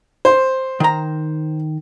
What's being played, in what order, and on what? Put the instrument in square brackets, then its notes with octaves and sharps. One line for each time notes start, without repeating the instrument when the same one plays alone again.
[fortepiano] C5
[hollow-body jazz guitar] D#3 A#5